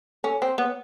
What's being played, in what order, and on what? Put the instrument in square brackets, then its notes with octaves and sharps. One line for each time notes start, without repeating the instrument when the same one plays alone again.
[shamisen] C#4 [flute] A4
[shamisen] C4 [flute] C5
[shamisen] B3 [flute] C#5